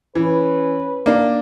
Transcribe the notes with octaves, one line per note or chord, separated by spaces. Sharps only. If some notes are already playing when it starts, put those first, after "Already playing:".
E3 C#4 B4
A#3 D4